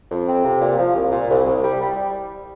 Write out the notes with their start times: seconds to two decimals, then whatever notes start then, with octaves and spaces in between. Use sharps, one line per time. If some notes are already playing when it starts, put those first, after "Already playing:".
0.10 F2
0.27 C4
0.44 C3
0.61 A#2
0.78 F3
0.95 C2
1.12 A#2
1.30 C2
1.46 C2
1.62 G3
1.80 G3